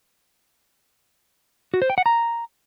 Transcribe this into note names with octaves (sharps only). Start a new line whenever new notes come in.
F#4
C5
G5
F#5
A#5